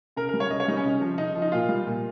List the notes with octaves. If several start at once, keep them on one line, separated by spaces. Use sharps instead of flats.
C#3 A#4
A#4
G3
C#5
C#3 D#5
C#5
G3 D#4
C#4
C#3
F3
C#3 D#4
F3
D#4
A#2 F4
G3
A#2